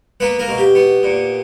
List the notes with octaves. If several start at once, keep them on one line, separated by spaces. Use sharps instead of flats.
A#3 B3 B4
A#3 A#4
B2
G4
B3
A#2